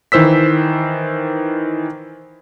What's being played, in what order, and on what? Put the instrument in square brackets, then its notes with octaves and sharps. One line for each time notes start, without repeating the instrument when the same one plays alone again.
[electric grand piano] D#3 E3 C5 E6 B6